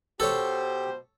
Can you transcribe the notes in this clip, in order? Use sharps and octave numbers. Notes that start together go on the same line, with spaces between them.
B2 B3 G4 A4 C5 C#5